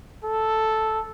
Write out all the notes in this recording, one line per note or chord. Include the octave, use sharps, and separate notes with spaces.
A4